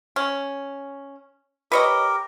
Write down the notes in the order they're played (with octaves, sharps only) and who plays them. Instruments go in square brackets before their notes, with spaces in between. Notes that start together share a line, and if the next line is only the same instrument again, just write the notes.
[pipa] C#4
[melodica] G4 A#4 [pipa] B4 C#5 D#5